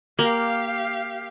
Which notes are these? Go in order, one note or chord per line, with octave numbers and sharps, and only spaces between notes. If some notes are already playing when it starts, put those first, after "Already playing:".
A#3 G4 F5